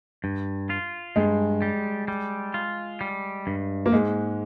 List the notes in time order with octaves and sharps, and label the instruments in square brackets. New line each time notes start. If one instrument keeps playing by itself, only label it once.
[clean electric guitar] G2
F4
[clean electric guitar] G2 [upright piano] G#3
[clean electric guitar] G3
G3
F4
G3
G2
[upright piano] A#3
[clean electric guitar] G#2 [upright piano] G#3